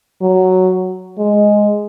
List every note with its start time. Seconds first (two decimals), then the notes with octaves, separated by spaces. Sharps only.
0.22 F#3
1.18 G#3